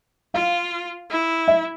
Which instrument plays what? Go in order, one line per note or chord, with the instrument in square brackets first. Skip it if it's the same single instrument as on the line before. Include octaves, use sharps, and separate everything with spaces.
[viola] F4 [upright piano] F5
[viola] E4
[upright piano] E5